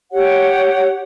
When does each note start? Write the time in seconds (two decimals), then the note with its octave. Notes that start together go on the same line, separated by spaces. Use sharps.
0.11 G4 C#5 F#5